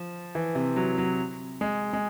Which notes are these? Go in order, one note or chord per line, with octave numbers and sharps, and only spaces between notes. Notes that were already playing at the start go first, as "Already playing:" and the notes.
Already playing: F3
E3
C3
F#3
F#3
G#3
G#3